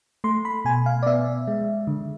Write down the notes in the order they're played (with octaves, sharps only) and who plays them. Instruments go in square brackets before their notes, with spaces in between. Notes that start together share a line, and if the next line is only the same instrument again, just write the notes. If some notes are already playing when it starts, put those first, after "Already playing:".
[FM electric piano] A3 C6
B5
B2 G#5
F5
D5
B3 E5
G#3
D3